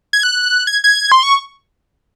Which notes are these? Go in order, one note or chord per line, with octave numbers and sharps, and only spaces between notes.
G#6
F#6
G#6
G#6
C6
C#6